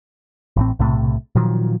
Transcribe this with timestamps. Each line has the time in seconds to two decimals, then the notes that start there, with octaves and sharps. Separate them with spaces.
0.56 A1 A2 C4
0.79 B1 A2 C3 A3
1.35 A#2 D#3 F3 F#3